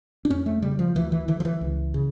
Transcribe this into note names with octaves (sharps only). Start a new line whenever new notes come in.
D4
F2 C#4
A3
C#3 G3
F3
D2 E3
E3
D3 E3
F3
E3
C#2
C#3